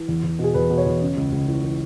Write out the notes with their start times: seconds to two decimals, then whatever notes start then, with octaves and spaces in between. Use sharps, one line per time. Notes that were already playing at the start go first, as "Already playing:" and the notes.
Already playing: E3
0.08 E2
0.23 E2
0.39 B2
0.44 G#4
0.54 E2 B4
0.70 B2
0.78 C#5
0.86 E2
1.01 C#3
1.17 C#2
1.32 C#2
1.47 E3
1.63 E3